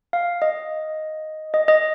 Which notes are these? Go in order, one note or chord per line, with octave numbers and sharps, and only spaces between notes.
F5
D#5
D#5
D#5